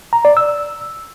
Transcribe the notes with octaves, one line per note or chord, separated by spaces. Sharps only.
A#5
D5
E6